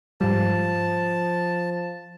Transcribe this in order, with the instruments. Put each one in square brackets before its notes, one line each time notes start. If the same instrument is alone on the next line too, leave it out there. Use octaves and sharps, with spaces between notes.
[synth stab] G#2 G3 [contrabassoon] F3 [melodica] A5